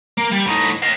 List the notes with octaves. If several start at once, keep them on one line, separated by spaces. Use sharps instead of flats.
A#3
G3
A2 D#4
D#5 F5